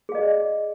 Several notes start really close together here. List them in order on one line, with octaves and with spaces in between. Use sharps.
G#4 F5 D#5 D5